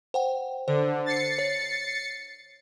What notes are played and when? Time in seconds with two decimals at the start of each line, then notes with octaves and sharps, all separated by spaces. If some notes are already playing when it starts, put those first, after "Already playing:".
0.14 C5 F#5 G5
0.68 D3 C5
1.06 A6 C7 C#7
1.39 C#5